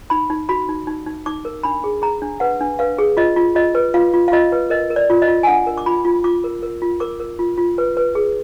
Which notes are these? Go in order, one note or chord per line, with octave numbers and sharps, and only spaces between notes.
D#4 B5
D#4
F#4 B5
D#4
D#4
D#4
D#4 D6
A#4
D4 B5
G#4
G#4 A#5
D4
B4 F#5
D4
B4 F5
G#4
F4 D#5
F4
F4 D#5
B4
F4 F5
F4
F5
F4 D#5
B4
A#4 D#5
A#4
D5
F4
D#5
F4
G#5
D4 F#5
A#4
D6
F4 B5
F4
F4 D6
A#4
A#4
F4
A#4 D6
A#4
F4
F4
B4
B4
G#4